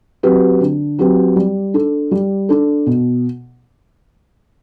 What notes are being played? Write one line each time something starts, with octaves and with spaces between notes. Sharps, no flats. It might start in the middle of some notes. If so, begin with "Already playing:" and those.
F#3 C4 G4 B4
D3
F#3 C4 G4 B4
G3
D4 A4
G3
D4 A4
B2